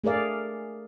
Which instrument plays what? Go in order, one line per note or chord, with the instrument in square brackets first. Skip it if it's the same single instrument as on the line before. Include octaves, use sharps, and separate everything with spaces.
[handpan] A3 G#4 A#4 D5 F5